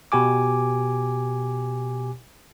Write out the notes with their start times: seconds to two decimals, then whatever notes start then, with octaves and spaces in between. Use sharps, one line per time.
0.12 B2 G4 G#5 D6